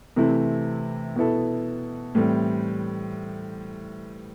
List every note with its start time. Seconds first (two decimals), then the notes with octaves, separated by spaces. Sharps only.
0.16 C3 E3 A3 C4 E4
1.15 B2 B3 E4 A4
2.15 A2 E3 G3 C4